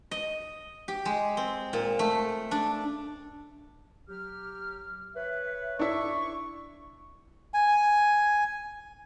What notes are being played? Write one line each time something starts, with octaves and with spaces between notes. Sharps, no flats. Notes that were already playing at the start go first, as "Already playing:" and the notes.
D#5
G4
G#3
C4
A#2
A3
D4
F#3 G4 F6
B4 C#5 E5
D4 E4 C#6
G#5